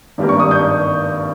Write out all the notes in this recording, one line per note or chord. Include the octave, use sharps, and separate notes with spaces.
G#1 G2 G3 A#3
C#6
D#6
G6